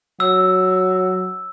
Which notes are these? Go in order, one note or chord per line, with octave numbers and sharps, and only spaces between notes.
F#3 E6